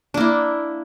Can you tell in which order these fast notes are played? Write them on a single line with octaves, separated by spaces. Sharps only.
D4 A#3 E4